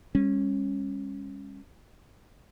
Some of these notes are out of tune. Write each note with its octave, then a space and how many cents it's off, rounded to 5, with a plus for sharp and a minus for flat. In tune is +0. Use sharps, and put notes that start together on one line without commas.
G3 +45 C#4 -20